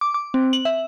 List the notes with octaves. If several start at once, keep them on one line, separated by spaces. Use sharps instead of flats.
D6
D6
C4
F#7
E5